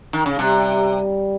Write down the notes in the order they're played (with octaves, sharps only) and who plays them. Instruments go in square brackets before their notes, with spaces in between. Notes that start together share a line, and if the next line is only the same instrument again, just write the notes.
[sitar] D#3
C#3
[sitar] C3 [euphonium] G3